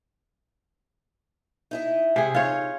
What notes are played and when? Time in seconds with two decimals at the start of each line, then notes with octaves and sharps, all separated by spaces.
1.71 D#4 E4 D#5
2.16 C3 G#4
2.34 D#4 F4 C#5